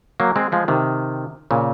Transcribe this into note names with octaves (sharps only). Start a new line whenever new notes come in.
F#3 A#3
G#3 C4
F3 G#3
C3 D#3
A#2 C#3